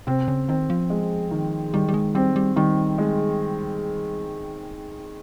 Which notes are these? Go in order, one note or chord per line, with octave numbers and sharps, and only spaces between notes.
C3 C4
C#3
D#3 C4
F3
G#3
D#3
D#3 G3
G3
G#3
G3 C4
G3
D#3 G3
G#3